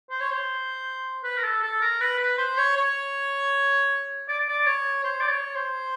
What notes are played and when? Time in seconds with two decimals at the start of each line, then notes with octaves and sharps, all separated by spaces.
0.10 C5
0.20 C#5
0.31 C5
1.24 B4
1.37 A#4
1.44 A4
1.62 A4
1.81 A#4
2.00 B4
2.19 B4
2.38 C5
2.57 C#5
2.76 C#5
4.28 D5
4.48 D5
4.66 C#5
5.04 C5
5.20 D5
5.30 C#5
5.55 C5